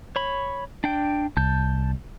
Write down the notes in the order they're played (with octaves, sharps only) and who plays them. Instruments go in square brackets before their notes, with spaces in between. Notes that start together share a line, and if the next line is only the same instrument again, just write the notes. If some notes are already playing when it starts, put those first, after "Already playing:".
[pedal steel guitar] C#5 B5
D4 G5
[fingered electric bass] C2 [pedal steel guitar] A5 G6